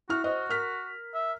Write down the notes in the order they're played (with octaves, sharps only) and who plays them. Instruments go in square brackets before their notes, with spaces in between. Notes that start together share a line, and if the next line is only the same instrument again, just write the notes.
[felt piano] E4 F6 [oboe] F#4
[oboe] F#4 [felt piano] C5 D#5
[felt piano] A#4 F6 B6
[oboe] E5